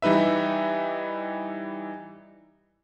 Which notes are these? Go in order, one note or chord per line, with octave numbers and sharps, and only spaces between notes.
E3 G3 D#4 B4 E5